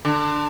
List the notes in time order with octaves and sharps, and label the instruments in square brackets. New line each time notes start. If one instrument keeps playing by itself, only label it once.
[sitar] D3